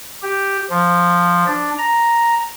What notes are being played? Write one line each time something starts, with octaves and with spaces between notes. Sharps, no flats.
G4
F3
D4
A#5